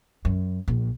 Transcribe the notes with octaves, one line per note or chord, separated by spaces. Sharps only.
F#2
A#1